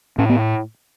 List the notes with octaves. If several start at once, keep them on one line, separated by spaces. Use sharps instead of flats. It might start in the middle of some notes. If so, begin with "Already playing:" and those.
A2 C#4
B3